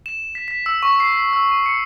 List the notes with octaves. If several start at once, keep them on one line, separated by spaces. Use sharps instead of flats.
E7
B6
B6
E6
C#6
C7
B6
E6
D#7
C#7